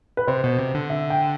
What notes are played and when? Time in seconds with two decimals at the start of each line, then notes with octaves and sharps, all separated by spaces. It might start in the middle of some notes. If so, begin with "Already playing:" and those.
0.17 B4
0.27 C3 C5
0.44 B2
0.59 C3
0.74 D3
0.90 E5
1.10 G5